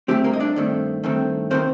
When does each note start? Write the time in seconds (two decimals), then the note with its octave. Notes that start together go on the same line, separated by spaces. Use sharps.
0.08 G2 D#3 G3 A3 C4 G4
0.24 A#3 A#4
0.33 D#5
0.40 D4 D5
0.56 G2 D#3 A3 C4
1.04 G2 D#3 A3 C4
1.51 C3 D#3 A#3 C4 C5